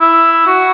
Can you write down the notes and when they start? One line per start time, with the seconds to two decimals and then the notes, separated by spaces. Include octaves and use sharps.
0.01 E4
0.47 F#4